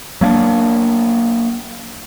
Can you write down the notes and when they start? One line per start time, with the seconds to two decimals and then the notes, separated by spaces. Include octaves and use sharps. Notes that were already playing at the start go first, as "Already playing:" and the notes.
0.21 F#3 A#3 C4 D4